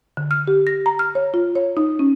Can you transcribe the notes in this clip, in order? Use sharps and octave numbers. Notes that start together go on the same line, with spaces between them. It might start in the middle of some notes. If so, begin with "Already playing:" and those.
D3
F6
G4
A#6
A#5
F6
C#5
F4
C#5
D#4
C#4